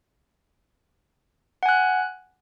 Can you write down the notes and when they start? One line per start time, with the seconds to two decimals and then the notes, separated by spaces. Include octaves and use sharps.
1.63 F#5
1.66 G#5
1.69 F#6